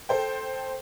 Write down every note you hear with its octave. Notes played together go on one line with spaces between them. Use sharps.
A4 C5 G5